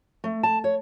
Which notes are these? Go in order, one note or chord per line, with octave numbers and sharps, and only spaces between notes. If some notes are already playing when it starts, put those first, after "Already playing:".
A3
A5
C#5